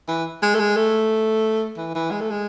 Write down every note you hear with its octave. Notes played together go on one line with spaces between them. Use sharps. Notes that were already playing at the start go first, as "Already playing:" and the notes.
E3
G#3
A3
G#3
A3
E3
E3
G#3
A3
G#3